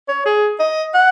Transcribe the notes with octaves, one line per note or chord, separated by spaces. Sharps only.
C#5
G#4
D#5
F#5